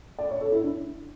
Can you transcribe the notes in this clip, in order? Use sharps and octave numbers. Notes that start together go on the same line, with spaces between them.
D5
C#5
A4
E4
D4